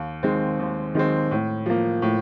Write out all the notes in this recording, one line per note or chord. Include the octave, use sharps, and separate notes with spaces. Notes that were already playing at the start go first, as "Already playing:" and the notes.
Already playing: D#2
D#3 G#3 C4
D#2
D#3 G#3 C4
A2
F3 A#3
A2